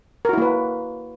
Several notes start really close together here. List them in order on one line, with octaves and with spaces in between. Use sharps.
A#4 F#4 E4 A#3 B4